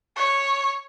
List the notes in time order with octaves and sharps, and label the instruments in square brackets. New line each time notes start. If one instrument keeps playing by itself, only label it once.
[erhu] C#5